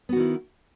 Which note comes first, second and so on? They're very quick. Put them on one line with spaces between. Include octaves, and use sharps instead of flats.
B3 F#4 D#3 E4